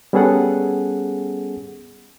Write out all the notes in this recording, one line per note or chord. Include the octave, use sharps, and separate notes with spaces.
G3 B3 C#4 G#4 A4 F#5